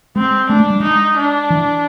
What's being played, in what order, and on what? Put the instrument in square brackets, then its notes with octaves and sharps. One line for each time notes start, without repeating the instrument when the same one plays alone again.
[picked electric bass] G#3 [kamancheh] C4
[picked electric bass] A3 [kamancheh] D4
[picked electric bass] G#3
G3
[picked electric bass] G#3 [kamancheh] D#4
[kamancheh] D4
[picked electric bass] E3